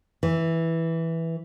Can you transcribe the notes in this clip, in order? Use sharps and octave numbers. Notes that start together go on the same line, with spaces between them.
E3